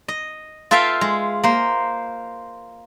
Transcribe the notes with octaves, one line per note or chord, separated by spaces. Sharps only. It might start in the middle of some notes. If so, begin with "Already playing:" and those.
D#5
F4 A4 B4 E5 F5 G5
G#3
A#3 C5